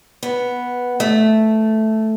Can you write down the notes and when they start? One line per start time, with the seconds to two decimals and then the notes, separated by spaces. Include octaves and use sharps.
0.23 B3
1.00 A3